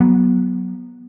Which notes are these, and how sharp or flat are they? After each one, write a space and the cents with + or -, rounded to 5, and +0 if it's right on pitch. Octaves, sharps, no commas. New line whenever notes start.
F#3 +0 B3 -20